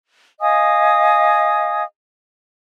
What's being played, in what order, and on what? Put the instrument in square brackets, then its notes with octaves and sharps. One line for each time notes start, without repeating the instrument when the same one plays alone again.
[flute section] D#5 F5 G#5 D#6